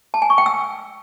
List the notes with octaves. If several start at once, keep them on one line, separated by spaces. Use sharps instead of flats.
A5
G#5
C#6
G5
E6